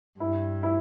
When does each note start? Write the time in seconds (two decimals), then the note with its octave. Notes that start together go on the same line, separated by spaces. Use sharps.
0.20 G2 E4
0.63 E4